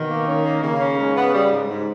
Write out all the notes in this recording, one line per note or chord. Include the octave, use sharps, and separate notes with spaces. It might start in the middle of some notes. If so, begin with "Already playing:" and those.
Already playing: B2 D#3
A#3
C#4
A#3
C#3 A#3
C#4
G#2
B3
G3
G#2
G#2